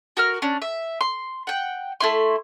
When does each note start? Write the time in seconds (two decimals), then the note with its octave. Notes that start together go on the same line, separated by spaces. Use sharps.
0.17 F#4 A#4 F6
0.42 C#4 D4
0.62 E5
1.01 C6
1.47 F#5 G5
2.01 A3 E4 C6